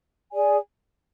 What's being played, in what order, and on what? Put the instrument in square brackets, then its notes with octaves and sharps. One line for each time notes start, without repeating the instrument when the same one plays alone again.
[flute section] G#4 D5 G#5